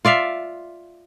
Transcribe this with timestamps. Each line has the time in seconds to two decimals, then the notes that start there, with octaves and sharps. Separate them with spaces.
0.05 F4 D5 E5 F5